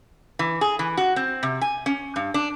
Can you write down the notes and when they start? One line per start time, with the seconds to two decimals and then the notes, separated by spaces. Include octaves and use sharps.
0.39 E3
0.61 G#4
0.79 E3
0.97 F#4
1.16 C4
1.43 C3
1.61 G#5
1.86 C#4
2.16 G2
2.34 D4